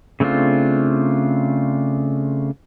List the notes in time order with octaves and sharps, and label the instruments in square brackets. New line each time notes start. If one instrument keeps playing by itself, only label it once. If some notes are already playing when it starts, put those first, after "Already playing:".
[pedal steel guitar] C#3 A3 C4 D4 F4